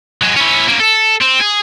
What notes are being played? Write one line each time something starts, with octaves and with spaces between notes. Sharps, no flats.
F#3 G#3
C#4 E4
A#3 C#4
A4
C4
G#4